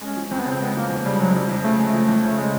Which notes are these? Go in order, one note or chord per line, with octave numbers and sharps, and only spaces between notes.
G#3 C#4
F3
F2 C4
B3
C#3 C4
G#3 B3
F3 A#3
F2
C#3 G3
F#3 G#3
F3 G3
F2
C#3 A3
G#3 A3
F3
F2
C#3 A3
C#3 G#3